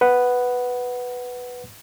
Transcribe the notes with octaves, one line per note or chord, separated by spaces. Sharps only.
B4 F#5